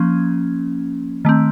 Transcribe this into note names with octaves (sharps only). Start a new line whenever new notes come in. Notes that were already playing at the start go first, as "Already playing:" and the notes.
Already playing: F3 A#3 C#4
D#3 A3 C4